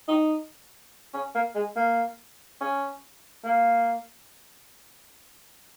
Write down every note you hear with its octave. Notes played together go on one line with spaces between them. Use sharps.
D#4
C#4
A#3
G#3
A#3
C#4
A#3